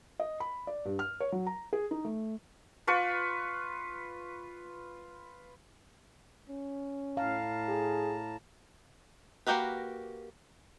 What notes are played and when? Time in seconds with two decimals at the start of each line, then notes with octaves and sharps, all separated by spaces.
0.20 D#5
0.40 B5
0.67 D5
0.85 G2
0.99 F6
1.20 C#5
1.32 F#3
1.47 A#5
1.73 G#4
1.91 D#4
2.05 A3
2.87 F4 B4 C#6
6.49 C#4
7.17 A2 F5 A5 A#5
7.68 G#4
9.47 A#3 F#4 G4 A#4 B4